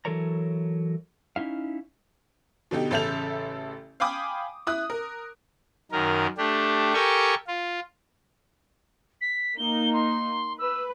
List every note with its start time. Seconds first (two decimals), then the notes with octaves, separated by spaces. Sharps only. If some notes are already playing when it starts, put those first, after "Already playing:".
0.05 E3 F#3 A4 A#4 C#5 A#5
1.36 C#4 D#4 E4 F5
2.71 B2 D3 D#4 G4
2.91 A1 C#3 A4 E5 G6 F7
4.00 F5 G5 G#5 B5 D6 D#6
4.67 E4 D#6 F#6
4.90 A#4
5.92 F#2 D#3 A#4
6.38 A3 D4 G4
6.94 G4 A4 A#4 G5 G#5 C#6
7.47 F4
9.21 B6
9.58 A#3 D#4 G7
9.93 C6
10.59 B4 E6